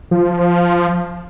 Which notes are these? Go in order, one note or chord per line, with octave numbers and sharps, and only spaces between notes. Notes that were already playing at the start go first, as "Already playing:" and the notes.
F3